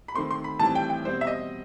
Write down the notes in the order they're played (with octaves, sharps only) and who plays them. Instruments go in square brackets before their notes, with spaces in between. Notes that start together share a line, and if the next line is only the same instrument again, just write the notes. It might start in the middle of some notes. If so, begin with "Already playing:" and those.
[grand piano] B5
[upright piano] D#3 A3 C4 [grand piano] C6
[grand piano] C6
B5
[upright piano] A2 E3 G3 C4 [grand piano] A5
[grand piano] G5
G5
[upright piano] B2 G3 C4 [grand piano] C5
[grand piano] E5
D#5